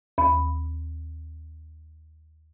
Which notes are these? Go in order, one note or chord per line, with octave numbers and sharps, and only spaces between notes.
D#2 B5